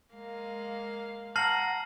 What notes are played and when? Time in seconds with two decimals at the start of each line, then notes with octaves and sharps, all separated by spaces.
0.14 G#3 A#3 F5
1.36 F#5 A5 A#5 F6 C7 F#7